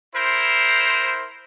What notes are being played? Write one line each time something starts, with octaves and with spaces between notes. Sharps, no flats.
E4 A#4 C5